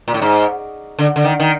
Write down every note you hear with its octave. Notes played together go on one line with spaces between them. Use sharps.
A#2
A2
G#2
D3
D3
D#3
D#3